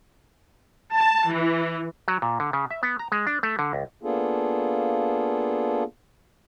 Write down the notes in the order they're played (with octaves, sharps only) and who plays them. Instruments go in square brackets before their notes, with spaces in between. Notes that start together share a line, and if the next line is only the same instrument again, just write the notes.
[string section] A5
E3
[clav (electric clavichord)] F#3
A#2
D3
C#3
E5
B3
A#5
G#3
D4
A3
D3
C#2
[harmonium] A#3 B3 D4 F4 G#4 A4